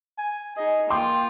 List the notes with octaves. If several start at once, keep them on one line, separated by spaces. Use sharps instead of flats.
G#5
D#4 G#4 D#5
A#3 F4 G5 C6 D6